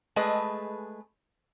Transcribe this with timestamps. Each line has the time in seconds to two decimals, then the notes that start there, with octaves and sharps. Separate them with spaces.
0.16 G#3 A3 G#4 B4 D#5